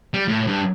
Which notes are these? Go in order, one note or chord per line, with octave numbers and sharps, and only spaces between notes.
G3
A2
G2